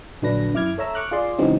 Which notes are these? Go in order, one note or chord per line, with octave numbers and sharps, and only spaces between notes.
A#1 D3 F#3 D4 B4 A#6
F#2 E4 D6 F6 G#6
A4 C#5 E5 A#5 E6
C#6 D6 F6 F#6
F4 G#4 D5 C6
C#3 E3 F#3 G#3 C4 D#4